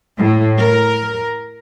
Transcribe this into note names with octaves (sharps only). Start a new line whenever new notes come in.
A2
A#4